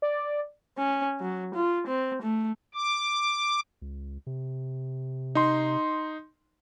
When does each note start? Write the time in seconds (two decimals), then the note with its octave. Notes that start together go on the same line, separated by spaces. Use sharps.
0.02 D5
0.78 C#4
1.20 F#3
1.55 F4
1.87 C4
2.22 A3
2.74 D6
3.82 C#2
4.27 C3
5.35 D#4 C6